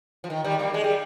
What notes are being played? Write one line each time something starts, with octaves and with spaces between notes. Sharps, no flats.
F3
D#3
D#3 G3
G3 A#3
G#3
G3